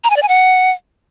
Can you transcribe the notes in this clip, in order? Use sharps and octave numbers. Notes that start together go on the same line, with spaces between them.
A#5
G#5
D5
G#5
F#5